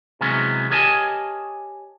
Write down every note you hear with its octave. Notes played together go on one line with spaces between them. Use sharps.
C3 E3 F#3 G#3 B3 C#4
G4 A#4 C#5 D#5 G#5 A5